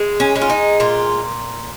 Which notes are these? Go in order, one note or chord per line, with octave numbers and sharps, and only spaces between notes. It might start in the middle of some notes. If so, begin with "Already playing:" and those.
Already playing: G#3
C#4
G#3
F4
D#4
A#2 F4